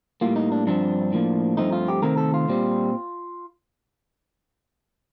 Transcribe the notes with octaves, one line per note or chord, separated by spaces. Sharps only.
A2 G3 A#3 F4
D#4
D4
G2 F3 C4 D4
A2 F3 A#3
G2 F3 A3 C4 D#4
F4
G4
C3 D#3 A3 C4 A#4
A4
F4
A#2 G3 C4